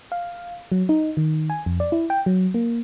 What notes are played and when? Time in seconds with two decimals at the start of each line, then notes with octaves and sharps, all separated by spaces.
0.12 F5
0.72 F#3
0.89 D#4
1.17 D#3
1.50 G#5
1.66 F2
1.80 D5
1.92 E4
2.10 G5
2.26 F#3
2.54 A#3